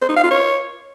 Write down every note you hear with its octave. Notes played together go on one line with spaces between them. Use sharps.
C5
D#4
F5
F4
C#5